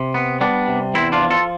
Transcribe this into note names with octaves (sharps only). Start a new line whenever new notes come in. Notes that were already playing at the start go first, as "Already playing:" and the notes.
Already playing: C3
B3
G3 B3 D4
C3
E2 C4 E4
D4 F4
F3
F4 A4